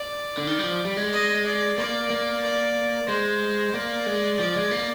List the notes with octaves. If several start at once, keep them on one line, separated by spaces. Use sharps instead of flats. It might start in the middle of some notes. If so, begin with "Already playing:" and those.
Already playing: D5
D3
D#3
G3
F3
G3
G#3
D#5
D5
A#3 D5
A#3
D5
G#3 C5
A#3 D5
G#3
F3 D5
G#3
A#3